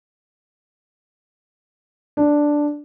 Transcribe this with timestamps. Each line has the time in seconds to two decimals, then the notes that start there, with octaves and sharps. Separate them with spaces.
2.17 D4